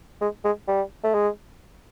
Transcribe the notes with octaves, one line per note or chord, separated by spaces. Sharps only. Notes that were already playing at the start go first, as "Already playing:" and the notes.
G#3
G#3
G3
A3
G#3